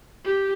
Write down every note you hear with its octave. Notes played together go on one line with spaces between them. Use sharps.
G4